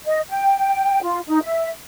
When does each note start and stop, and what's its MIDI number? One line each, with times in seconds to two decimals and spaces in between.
0.05 0.20 75
0.29 0.99 79
1.03 1.19 65
1.27 1.42 63
1.42 1.69 76